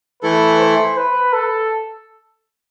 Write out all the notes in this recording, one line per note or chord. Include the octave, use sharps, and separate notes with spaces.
E3 A3 E4 A4 B4
C5
B4
A4